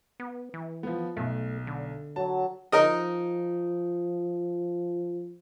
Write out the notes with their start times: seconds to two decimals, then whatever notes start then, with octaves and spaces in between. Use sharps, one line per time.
0.20 B3
0.54 E3
0.83 F3 B3
1.17 B1 A3
1.67 D3
2.16 F#3 A5
2.72 F3 D#4 A#4 D#5